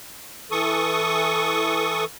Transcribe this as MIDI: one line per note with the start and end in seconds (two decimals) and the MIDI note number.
0.51 2.04 52
0.51 2.04 69
0.51 2.04 85
0.51 2.04 87